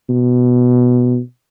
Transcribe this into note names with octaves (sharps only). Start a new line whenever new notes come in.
B2